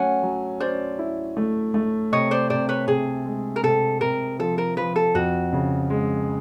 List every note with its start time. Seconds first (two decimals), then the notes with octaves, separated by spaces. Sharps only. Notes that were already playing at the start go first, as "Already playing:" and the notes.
Already playing: F#3 A3 C#4 F#5 G#5
0.23 F#3
0.60 C#4 C5 D5
0.99 E4
1.37 A3
1.74 A3
2.12 C3 C#5 D#5
2.31 C5 D5
2.50 C3 C5 D5
2.69 B4 C#5
2.87 C3 G#4
3.25 G#3
3.56 A#4
3.63 C3 A4
4.01 C3 A#4
4.39 F3 A4
4.58 A#4
4.77 F3 B4
4.96 A4
5.15 F2 F#4
5.53 C#3
5.90 G#3